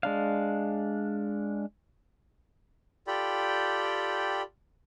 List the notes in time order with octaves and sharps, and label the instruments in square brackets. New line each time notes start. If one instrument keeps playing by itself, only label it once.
[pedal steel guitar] G#3 D4 F5
[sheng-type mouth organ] F4 G4 A4 D5 G5 B5